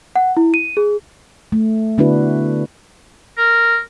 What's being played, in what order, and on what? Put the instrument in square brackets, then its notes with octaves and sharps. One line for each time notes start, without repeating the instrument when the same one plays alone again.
[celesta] F#5
E4
D#7
G#4
[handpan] A3
D3 B3 D4 E4 F#4 B4
[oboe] A#4